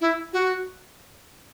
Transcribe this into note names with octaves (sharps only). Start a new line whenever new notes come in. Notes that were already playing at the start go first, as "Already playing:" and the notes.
E4
F#4